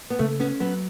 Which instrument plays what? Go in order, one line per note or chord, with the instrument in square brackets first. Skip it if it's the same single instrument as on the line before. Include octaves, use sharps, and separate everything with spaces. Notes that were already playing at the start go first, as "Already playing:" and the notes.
[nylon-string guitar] B3
[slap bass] C#3 [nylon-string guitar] A3
[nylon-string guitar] B3 [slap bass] C#4
[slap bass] F#3 [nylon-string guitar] B3